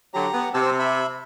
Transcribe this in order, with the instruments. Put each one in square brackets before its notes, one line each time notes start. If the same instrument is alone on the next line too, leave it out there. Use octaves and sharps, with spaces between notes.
[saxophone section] D3 F#3 [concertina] G4 A#5
[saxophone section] B3
[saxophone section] C3 [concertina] C4 A5 E6
[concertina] E5 B5